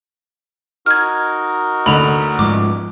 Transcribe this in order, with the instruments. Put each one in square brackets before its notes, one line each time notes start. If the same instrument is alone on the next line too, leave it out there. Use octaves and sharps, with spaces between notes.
[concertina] D#4 F#4 A#4 [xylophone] F6 G#6
[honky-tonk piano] D2 D3 [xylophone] B5 F7
[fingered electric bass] G#2 F3 [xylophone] D6